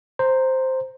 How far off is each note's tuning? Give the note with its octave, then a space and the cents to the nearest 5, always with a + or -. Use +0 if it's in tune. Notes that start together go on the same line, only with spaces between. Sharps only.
C5 +0 A#5 -5